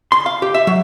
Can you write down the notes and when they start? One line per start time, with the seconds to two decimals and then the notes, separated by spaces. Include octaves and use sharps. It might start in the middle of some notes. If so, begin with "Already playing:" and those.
0.12 C6
0.26 F5
0.42 G4
0.54 E5
0.67 F#3